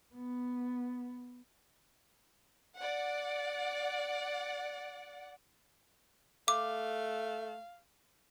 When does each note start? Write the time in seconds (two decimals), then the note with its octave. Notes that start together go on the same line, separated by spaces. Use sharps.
0.14 B3
2.78 D5 F#5
6.48 A3 F5 D6